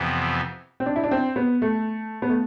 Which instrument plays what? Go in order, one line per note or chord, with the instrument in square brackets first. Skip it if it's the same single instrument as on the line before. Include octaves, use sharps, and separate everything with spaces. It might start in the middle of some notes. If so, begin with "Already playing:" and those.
Already playing: [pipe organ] F2 C3 E3 B3
[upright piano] C4
D4
E4
D4
C4
B3
A3
B3
A3